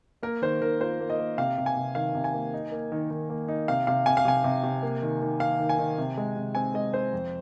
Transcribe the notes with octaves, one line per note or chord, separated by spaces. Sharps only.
A#3 A#4
D#3 C5
D#3 A#4
F4 C5
A#3
D#5
A#3
C3 F5
C3
G#5
C3
D#3 F5
C3
G#5
A#3
D#4
A#3
D#3
D#3
A#3
D#4
C3 F5
C3 F5
C3 G#5
F5
C3 G#5
C3
C3
A#3
D#3
D#3
D#3 F5
D#3
G#5
D#3
C3
G#3
C3
C4 G#5
G#3 D#5
C4 C5
F2